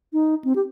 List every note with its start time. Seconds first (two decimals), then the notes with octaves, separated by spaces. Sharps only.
0.13 D#4
0.44 C4
0.55 G4